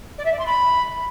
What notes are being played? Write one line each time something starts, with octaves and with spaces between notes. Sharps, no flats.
D5
E5
D5
C6
B5